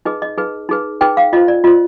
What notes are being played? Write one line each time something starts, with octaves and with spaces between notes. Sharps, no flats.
D#4 G#4 B4 D#5
D#5
D#4 G#4 B4
D#4 G#4 B4
D#4 G#4 B4 G5
F5
F4 C5 D#5
D5
F4 C5 D#5